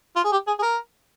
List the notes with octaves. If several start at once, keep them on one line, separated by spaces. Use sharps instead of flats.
F4
G#4
G4
G#4
G#4
A#4